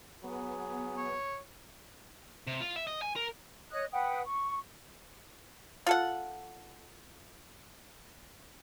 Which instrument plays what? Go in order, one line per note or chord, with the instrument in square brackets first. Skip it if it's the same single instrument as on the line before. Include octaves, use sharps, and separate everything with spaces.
[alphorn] F#3 [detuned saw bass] B3 [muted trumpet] G#4
[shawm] C#5
[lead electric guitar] C3
F4
E5
D#5
G#5
A#4
[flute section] C#5 D#5 D#6 F#6
B4 F#5 G5 D#6
C#6
[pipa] F4 A4 F#5